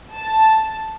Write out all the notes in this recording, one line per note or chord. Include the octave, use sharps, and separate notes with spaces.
A5